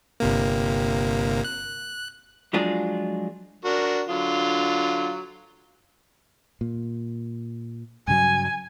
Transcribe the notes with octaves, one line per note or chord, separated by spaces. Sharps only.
G1 C3 A#3
F#6
F3 F#3 G#3 D4 F4 G#4
D4 F#4 A#4
D3 F#3 F4
A#2
G2 C#3 F#3 G#5